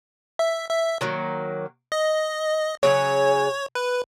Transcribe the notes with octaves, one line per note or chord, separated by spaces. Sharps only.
E5
E5
D#3 F#3 A#3
D#5
C#3 F#3 C#4 G#4 C#5
B4